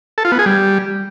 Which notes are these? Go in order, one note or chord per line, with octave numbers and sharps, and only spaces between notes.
A4
F4
B3
G#4
G3